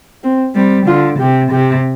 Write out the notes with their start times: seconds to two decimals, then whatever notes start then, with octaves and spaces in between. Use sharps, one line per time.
0.23 C4
0.55 G3 C4
0.87 D3 F4
1.19 C3 G4
1.52 C3 G4